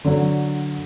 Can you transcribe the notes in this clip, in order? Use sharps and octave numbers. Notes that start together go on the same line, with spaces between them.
D3 F#3